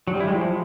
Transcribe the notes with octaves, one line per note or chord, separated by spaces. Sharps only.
F#3
G3
E4
G#3
F3